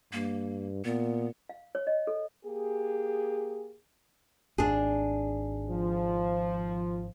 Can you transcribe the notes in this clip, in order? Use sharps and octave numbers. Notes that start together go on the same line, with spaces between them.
G2 A#3
A#2 B3
F5
C#5
D#5
A4
A#3 G4 G#4
G#1 D4 G#4
F3